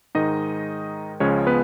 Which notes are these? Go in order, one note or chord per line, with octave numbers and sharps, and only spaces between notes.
G#2 D#3 G#3 D#4 D#5
C#2 C#3 F3 G#3 C#4 C#5
B3 B4